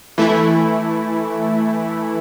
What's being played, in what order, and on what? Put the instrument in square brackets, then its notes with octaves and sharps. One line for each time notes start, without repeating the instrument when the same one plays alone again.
[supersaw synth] E3 A3 E4